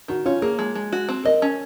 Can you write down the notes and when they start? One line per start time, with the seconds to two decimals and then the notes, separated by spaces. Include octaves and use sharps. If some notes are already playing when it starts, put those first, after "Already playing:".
0.08 D#3 F#4
0.25 C#4 F4
0.42 A#3 G#4
0.59 G#3
0.75 G#3
0.93 F#4
1.09 C4
1.25 A#4 D#5
1.42 C#4